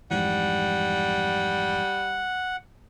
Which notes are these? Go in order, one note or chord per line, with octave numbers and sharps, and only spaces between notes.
F2 G#2 E3 G3 F#5